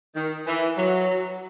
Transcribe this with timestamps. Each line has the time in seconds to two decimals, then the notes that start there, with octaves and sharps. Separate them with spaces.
0.16 D#3
0.47 E3
0.78 F#3